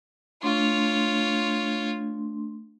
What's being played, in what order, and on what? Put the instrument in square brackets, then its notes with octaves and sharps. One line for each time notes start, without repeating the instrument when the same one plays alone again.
[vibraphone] A3 D4 C6 [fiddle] F4 C#5